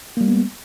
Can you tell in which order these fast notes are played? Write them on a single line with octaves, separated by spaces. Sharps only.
A#3 G3 G#3 B3